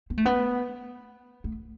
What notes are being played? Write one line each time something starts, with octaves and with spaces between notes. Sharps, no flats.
B3
A3
B3
A3